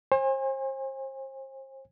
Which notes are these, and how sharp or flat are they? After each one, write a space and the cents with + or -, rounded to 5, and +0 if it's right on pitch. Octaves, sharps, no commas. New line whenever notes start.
C5 +35 G#5 -35